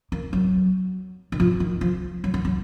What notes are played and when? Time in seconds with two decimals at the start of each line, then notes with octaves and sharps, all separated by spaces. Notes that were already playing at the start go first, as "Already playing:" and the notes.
0.12 A#3
0.33 F#3
1.32 D#3
1.40 F3
1.60 D#3
1.81 F3
2.24 F#3
2.34 F#3
2.45 F#3